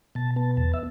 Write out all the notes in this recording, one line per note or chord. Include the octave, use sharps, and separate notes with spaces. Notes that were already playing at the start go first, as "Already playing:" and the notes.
B2 A5
B3 A5
E2 A5
E5